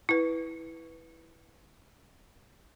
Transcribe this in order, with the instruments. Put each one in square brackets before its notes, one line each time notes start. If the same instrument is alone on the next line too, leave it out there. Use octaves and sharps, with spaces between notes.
[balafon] E4 B4